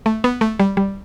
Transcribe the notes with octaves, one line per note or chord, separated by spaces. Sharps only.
A3
B3
A3
G3
G3